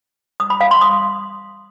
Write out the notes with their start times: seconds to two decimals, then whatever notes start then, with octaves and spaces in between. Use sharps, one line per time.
0.40 D#6
0.50 B5
0.61 F5
0.71 C6
0.81 D#6